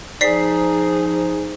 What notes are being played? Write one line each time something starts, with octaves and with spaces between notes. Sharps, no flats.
F3 D#4 G#4 C5 D5 B6 C7